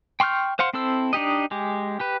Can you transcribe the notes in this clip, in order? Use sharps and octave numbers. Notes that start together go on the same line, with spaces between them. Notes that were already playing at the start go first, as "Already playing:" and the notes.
G5 C6 C#6 F6 G6
C5 F5 F#5 C6
C4 E4 A4 C5 E6
D4 D#4 G4 D#5
G#3 G4
G4 B4